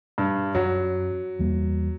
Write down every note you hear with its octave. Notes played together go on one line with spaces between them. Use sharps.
G2
F#2 F#3
E2 G3 A#3